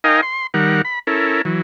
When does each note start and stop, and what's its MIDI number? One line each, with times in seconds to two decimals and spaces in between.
0.04 0.21 63
0.04 0.21 70
0.04 0.21 75
0.04 0.21 77
0.04 0.21 79
0.04 0.21 80
0.22 0.47 84
0.54 0.82 51
0.54 0.82 55
0.54 0.82 70
0.54 0.82 78
0.85 0.99 83
1.07 1.42 61
1.07 1.42 64
1.07 1.42 69
1.07 1.42 70
1.45 1.62 52
1.45 1.62 54